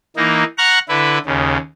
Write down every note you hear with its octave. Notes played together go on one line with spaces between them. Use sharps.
E3 A#3 D#4
F#5 A#5 C#6 F6 F#6
D3 E4 B4
D#2 C#3